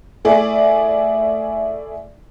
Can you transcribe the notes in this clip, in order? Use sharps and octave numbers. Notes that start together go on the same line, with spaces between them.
A3 E4 G#4 D5